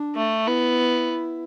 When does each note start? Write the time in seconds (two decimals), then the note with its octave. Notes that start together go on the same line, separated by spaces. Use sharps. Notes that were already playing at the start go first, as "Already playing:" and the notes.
Already playing: D4
0.16 A3
0.47 B3 E4